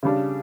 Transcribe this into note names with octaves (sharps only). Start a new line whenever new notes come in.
C#3 G3 D4